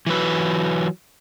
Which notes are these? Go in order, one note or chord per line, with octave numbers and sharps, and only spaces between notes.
E3 F#3 B4